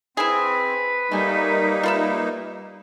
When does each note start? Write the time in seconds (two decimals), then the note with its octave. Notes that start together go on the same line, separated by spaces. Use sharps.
0.17 C4 E4 G#4 B4
1.11 G3 A3 A#3 D#4 G#5
1.83 F4 B4 E5